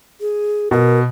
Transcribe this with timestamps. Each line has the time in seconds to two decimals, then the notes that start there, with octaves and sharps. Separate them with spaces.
0.21 G#4
0.71 B2 A#4